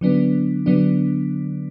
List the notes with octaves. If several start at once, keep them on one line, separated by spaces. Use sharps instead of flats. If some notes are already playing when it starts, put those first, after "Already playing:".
D3 F#3 B3 D4
D3 F#3 B3 D4